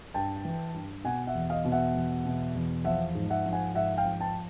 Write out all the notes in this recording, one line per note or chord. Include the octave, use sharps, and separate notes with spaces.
G2 G5 A5
E3
G2
B2 F#5 G#5
E5 F#5
E2
D#5 F5
B2
E5 F#5
E2
B2
E2
F3 E5 F#5
G#2
E5 F#5
F3
F#5 G#5
G#2 E5 F#5
F5 G5
F3
G5 A5